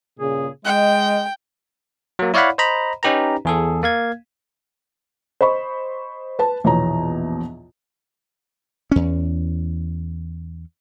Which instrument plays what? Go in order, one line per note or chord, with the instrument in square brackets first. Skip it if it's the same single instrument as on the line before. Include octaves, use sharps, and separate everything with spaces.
[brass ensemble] G2 A#2 C#3 [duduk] G#4
[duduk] G#3 [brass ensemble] D#5 [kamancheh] G5
[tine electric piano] F#3 A#3
E4 C#5 D5 F5 F#5 B5
C5 D#5 A#5 B5
C#4 D#4 G4 B4 A#5
E2 G#4 A4
A#3 F5 G#6
[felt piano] C5 D#5 B5 C#6
B4 A5
A#1 E2 B2 C#5 A#5
[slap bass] E2 C#4